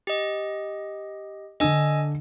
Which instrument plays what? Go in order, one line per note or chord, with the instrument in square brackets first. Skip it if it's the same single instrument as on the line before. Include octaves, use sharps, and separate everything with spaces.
[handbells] G4 D#5
[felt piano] D3 D4 [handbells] D#5 G#5 E6